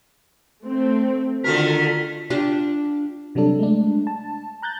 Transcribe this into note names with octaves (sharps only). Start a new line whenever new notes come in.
A3 C4
D3 D#3 F4 F#4 A4 A#4 B6
D4 F4 G4
C3 F#3 G3 D4 A4
G#3 A3 D4
A5
A#5 F#6 G6 A6